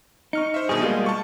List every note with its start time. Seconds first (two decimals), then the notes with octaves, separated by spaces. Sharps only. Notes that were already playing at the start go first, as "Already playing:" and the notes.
0.33 D#4 C#6 F6 C#7
0.54 C5 E5
0.69 G2 B2 D#3 G#4
0.82 G3 G#3 A#3 F4
1.06 A5 C#6